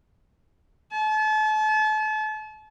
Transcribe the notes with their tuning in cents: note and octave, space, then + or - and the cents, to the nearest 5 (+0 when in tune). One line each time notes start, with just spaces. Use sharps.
A5 -35